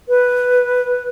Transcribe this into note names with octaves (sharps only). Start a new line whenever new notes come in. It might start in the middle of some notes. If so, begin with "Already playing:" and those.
B4